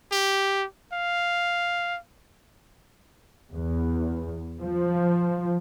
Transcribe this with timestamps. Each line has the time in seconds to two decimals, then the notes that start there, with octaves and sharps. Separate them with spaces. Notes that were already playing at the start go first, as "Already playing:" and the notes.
0.12 G4
0.93 F5
3.54 E2
4.61 F3